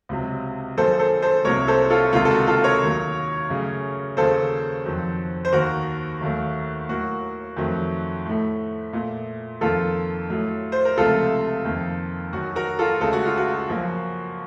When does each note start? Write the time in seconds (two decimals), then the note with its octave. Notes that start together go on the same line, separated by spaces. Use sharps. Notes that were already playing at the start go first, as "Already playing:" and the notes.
0.09 C#2 C3 F#3
0.77 F#2 D#3 A#3 A4 C5
0.99 A4 C5
1.22 A4 C5
1.45 C2 C3 F#3 A#3 A#4 C#5
1.68 A4 C5
1.90 F4 A4
2.13 C#2 C3 D#3 A#3 F4
2.25 A4
2.31 F#4
2.47 F4 A4
2.64 A#4 C#5
2.82 D#2 D#3 F#3 A#3
3.50 F#2 C#3 A3
4.17 D#2 C#3 F#3 A#3 A4 C5
4.85 F2 D#3 F#3
5.45 C5
5.53 D#2 D#3 A#3 F#4 A#4
6.21 D#2 D#3 F#3 A3
6.89 A2 F#3 A#3 F#4
7.57 F2 D#3 F#3 A3
8.26 A2 A3
8.93 A#2 A3
9.61 F2 D#3 A#3 F4 A4
10.28 A2 F#3 A3
10.72 C5
10.85 A#4
10.97 C#2 C3 F3 A3 F4 A4
11.65 F2 D#3 A#3
12.33 F#2 D#3 F#3 F#4
12.56 F#4 A#4
12.79 F4 A4
13.01 C#2 C#3 A3 A4
13.13 F#4
13.25 F4
13.37 F#4
13.69 F#2 F3 A#3